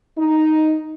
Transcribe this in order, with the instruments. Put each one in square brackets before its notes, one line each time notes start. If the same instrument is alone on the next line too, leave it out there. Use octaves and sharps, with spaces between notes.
[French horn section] D#4